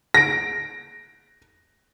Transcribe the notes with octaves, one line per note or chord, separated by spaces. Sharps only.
A#6 D7